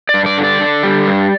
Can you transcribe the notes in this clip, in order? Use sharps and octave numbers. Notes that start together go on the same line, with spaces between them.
D5
G2
D5
D3
D5
D3
G3
G2